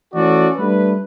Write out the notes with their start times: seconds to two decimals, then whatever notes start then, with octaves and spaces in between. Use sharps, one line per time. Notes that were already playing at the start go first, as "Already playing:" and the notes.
0.14 E3 A3 C#4 F#4 A4 D5
0.57 G3 A3 D4 B4